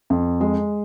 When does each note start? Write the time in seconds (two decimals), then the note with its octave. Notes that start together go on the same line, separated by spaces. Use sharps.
0.10 F2
0.41 G#3